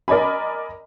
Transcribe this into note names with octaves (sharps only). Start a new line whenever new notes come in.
A#4 D5 D#5 G#5 B5